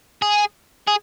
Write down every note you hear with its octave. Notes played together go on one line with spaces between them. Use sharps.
G#4
G#4